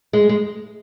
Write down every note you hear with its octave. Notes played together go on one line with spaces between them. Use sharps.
G#3
G#3